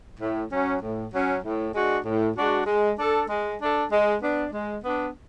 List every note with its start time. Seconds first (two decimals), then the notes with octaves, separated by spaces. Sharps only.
0.20 A2
0.52 F#3 C#4
0.82 A2
1.13 F#3 C#4
1.43 A2
1.74 G#3 D4 F#4
2.05 A2
2.36 G#3 D4 F#4
2.67 G#3
2.98 D4 A4
3.29 G#3
3.60 D4 A4
3.91 G#3
4.22 B3 D4
4.52 G#3
4.83 B3 D4